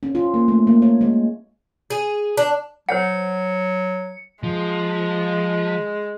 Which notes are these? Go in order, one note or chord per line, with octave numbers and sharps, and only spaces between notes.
C#4
F4
A#3
A3
A#3
C#5
G#3
G#4
D4
F#3 C5 C#5 F#5 C#7
F3 G#3